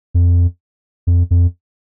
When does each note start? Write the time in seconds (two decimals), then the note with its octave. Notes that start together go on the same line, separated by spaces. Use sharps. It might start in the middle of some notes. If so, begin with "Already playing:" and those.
0.14 F2
1.07 F2
1.31 F2